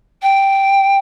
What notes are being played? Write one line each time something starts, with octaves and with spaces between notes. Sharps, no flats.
G5